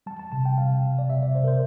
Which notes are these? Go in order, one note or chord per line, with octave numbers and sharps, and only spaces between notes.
G3 A5
A5
C3 A5
G5
C3 F5
G3
D5
C3 E5
D5
C3 C5
A#4
C5